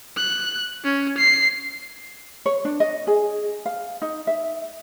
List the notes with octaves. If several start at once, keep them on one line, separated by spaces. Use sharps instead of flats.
F#6
C#4
C7
C#5
D4
D#5
G#4
F5
D#4
E5